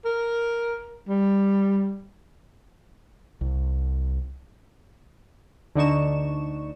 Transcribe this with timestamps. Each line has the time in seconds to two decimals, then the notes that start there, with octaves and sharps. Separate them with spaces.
0.05 A#4
1.08 G3
3.41 C2
5.75 D2 D3 D4 D#4 C#6 E7